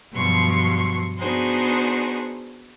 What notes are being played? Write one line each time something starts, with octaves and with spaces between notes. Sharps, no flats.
G2 B2 F3 F#3 C6 C#6
B3 D4 D#4 F#4 G#4 C5